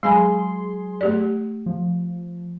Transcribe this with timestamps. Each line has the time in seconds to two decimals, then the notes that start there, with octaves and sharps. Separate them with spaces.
0.03 F#3 G#3 G#4 G#5 B5 C6
1.01 A3 G4 D5
1.66 F3